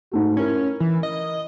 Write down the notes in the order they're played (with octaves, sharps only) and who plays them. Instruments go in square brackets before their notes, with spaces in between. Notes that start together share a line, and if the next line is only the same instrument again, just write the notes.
[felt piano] G#2 A3 F#4
[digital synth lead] C#4 [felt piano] E4 A#4
[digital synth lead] E3
D#5